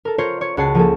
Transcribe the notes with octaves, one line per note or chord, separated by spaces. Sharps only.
A4 A#4
F4 A#4 C5 C#5
C#5
C#2 F#4 C#5 A5 C7
F3 A#3 G#4 A4